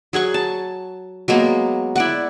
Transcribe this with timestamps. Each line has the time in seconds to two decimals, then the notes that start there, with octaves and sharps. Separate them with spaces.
0.13 F#3 G#4 F#5 C#6
0.34 A5
1.28 F#3 G#3 A#3 B3
1.96 E4 D5 F#5